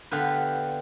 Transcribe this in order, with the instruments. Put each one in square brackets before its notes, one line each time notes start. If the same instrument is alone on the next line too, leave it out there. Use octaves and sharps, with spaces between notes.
[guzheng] D3 B3 F4 G4 B4